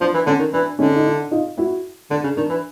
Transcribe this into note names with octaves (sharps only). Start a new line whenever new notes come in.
F3 D4
E3
D3 C#4
D#3
E3 D4
D3 C#4 D#4
D#4
D4 E4
D#4 F4
E4 F#4
D3 D4
C#3
D#3 D4
E3